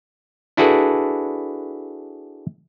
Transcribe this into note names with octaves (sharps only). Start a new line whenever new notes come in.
D4 E4 F#4 G#4 A4 B4